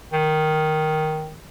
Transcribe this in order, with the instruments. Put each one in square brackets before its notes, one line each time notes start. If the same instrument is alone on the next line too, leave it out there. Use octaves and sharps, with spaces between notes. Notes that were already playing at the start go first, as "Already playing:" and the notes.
[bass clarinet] D#3